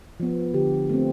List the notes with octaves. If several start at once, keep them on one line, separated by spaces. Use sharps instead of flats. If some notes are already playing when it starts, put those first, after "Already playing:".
F3 B3
D3 G4
A3 C4